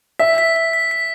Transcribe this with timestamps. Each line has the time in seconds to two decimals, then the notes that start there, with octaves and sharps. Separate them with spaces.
0.19 E5 B6
0.38 B6
0.56 B6
0.73 B6
0.91 B6